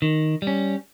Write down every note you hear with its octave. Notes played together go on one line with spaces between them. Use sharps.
D#3
G3
C#4